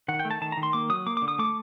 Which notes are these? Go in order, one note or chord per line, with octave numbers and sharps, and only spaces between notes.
D#3 F#5
G5
A3
A5
D#3 A5
D#3 A#5
C6
A#3 D6
F#3 D#6
A#3 D6
D3 D6
D#6
A3 D6